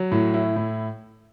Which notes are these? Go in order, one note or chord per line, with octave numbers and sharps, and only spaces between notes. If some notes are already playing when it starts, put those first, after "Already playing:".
Already playing: F#3
A2
E4
A2